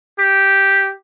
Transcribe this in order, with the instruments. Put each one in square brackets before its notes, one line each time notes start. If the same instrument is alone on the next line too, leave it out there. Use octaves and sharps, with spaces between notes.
[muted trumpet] G4